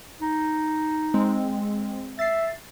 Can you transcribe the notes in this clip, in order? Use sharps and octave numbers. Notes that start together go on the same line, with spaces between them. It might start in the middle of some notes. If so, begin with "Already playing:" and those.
D#4
G#3 C4
E5 A6 C7